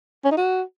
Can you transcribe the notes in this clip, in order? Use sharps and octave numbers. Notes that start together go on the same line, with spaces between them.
C#4
D#4
F#4